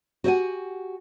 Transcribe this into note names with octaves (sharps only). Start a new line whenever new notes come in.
F#4 G4 C5 D#5 F#5 G#5